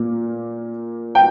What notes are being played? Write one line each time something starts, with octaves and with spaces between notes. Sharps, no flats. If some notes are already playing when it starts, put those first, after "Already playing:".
Already playing: A#2 A#3
G5